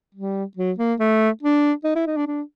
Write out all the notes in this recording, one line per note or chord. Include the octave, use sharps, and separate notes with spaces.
G3
F#3
A#3
A3
D4
D#4
E4
D#4
D4
D4